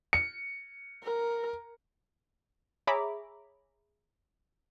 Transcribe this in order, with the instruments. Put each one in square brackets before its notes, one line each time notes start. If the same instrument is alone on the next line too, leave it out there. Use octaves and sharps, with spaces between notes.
[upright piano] C#7
[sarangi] A#4
[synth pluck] G#4 C#5 E5 A#5 B5 D6